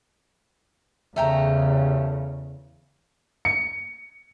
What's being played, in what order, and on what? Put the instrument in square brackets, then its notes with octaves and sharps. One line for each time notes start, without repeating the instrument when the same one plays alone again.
[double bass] E2 C#3 [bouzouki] A3 G4 A#5
[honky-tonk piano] C#7